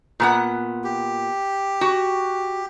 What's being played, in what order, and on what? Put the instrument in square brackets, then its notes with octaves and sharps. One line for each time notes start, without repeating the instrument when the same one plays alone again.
[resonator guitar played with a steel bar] A#2 B3 F#5
[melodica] G4
[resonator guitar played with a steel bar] F#4